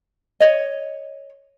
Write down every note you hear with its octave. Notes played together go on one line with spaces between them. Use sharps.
C#5 D#5